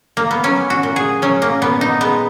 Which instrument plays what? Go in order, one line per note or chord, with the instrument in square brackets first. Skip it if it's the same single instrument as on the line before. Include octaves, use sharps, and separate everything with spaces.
[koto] A#3
B3
F#3 C#4
F#4
A#2
G#4
F#3 C#4
A#3
A#2 B3
D#4
G#3 B3